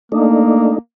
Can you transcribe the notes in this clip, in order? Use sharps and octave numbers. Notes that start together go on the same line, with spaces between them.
A3 A#3 D4 D#4